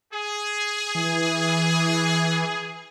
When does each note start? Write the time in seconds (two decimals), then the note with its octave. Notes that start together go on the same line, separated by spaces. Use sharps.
0.13 G#4
0.95 E3